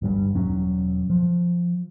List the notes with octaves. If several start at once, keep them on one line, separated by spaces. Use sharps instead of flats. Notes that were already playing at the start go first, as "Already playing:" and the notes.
G1 G2 G3
E1 F#3 C#4
F3